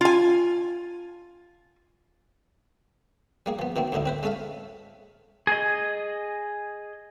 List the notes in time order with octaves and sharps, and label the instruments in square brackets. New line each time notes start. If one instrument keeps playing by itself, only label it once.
[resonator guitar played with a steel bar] F4 G#5
[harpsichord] G3 A#3 G#4
F3 B3
B2 D#3 A#3 C4
D2 A2 D3 D#4 E4
C4 B4 C5
G#3 C#4 A4 E5 F5
[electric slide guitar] G#4 D#5